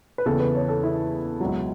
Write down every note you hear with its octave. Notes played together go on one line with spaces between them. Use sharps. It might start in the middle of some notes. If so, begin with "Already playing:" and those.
B4
E2 C#3 E3 A4
B4
C#5
A4
E4
C#2 B2 F#3